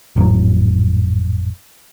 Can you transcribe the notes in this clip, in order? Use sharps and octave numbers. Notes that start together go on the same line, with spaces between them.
G#1 F2 A2 F#3